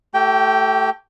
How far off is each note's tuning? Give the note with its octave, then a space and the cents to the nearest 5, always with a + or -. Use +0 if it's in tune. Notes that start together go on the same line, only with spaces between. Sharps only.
A3 +0 G4 -35 G5 +0